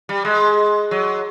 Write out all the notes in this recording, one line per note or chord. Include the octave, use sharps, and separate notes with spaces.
G3
G#3
F#3